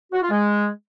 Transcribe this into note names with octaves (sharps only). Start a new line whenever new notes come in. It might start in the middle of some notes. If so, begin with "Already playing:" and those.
F#4
F4
G#3